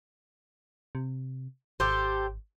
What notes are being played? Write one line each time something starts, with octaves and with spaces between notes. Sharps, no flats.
C3
G#1 G4 A4 C5